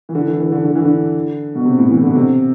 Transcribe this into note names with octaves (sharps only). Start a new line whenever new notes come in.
E3
D3
E3
E3
D3
D3
E3
D3
B2
C3
A2
E3
D3
B2
C3